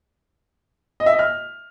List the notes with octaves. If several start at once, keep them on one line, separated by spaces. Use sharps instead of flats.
D#5
E5
D#5
F6